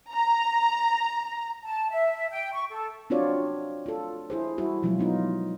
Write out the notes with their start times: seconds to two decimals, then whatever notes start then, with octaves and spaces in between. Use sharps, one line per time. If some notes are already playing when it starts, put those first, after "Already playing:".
0.12 A#5
1.64 A5
1.90 E5
2.31 G5
2.53 C#6
2.70 A4
3.10 C4 D4 F4 F#4 C#5 D5
3.86 F4 A4
4.30 E4 G#4 C5
4.58 G3 E4 F#4
4.83 B2 F3 F#3 G#3 E4 F4
4.99 B3 D#4 F4